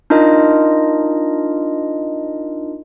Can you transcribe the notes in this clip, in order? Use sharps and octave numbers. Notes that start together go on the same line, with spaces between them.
D4 D#4 F4 A#4 D#5